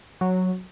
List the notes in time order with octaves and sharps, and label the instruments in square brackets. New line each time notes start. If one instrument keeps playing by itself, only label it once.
[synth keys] F#3